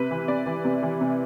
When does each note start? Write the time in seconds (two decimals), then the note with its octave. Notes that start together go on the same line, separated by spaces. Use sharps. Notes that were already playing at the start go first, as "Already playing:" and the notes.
Already playing: C3 B4
0.11 E3
0.28 C3 D5
0.46 E3
0.65 C3
0.83 E3
1.01 C3